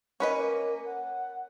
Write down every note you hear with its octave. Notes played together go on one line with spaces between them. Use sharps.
A#3 C#4 B4 D#5
F#5